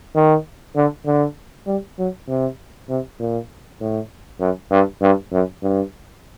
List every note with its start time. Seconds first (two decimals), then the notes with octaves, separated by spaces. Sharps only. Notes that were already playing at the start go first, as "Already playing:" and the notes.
0.16 D#3
0.76 D3
1.06 D3
1.67 G3
1.98 F#3
2.28 C3
2.89 C3
3.19 A#2
3.80 A2
4.40 F#2
4.71 G2
5.01 G2
5.32 F#2
5.62 G2